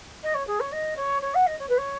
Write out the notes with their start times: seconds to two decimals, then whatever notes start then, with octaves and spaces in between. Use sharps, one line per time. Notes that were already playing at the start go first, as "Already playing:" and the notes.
0.23 D#5
0.34 C#5
0.47 G#4
0.60 C#5
0.72 D#5
0.96 C#5
1.22 C#5
1.34 F#5
1.46 D#5
1.59 C#5
1.68 B4
1.77 C#5